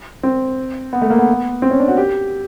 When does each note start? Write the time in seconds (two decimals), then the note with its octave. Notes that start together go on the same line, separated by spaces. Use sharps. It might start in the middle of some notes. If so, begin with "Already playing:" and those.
0.23 C4
0.93 B3
1.02 A3
1.10 A#3
1.19 B3
1.62 C4
1.71 C#4
1.80 D4
1.88 F#4
1.97 G4